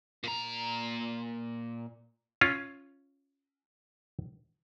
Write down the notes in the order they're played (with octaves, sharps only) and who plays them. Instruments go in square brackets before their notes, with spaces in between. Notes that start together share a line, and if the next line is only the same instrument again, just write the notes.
[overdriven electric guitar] A#2 A#5
[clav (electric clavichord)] C#4 F4